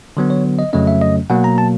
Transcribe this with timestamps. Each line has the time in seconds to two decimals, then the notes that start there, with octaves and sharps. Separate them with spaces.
0.17 D3 F#3 B3
0.30 C#5
0.59 D#5
0.73 F2 C#3 F#3 A3 C#4 D#5
0.87 E5
1.02 D#5
1.30 B2 F#3 A#3 F#5
1.44 A#5
1.58 A5